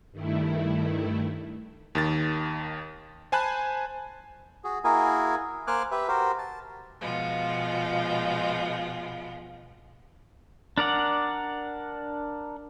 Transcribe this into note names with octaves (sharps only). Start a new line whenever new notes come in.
G2 D#3 A3 E4
D#2 D#3 A6
C5 G#5 A5 B5 F#6
F#4 G#4
A#3 E4 F#4 G#4 A#4 G#5
A#3 C5 G#5 D6 F6 F#6
G4 B4 E5
F#4 G4 A#4 C5
A5
B2 F3 G#3 F4
D4 A#4 D5 F#5